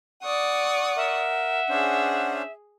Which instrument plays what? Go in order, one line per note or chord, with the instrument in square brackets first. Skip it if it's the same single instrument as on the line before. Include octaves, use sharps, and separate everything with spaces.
[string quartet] D5 C#6 D#6 [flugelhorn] F#5
[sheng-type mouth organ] A#4 [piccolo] E5
[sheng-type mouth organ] C#4 D4 C5 [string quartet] G#4